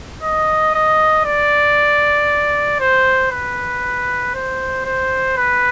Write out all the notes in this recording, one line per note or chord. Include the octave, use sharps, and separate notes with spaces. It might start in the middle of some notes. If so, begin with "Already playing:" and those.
D#5
D#5
D5
C5
B4
C5
C5
B4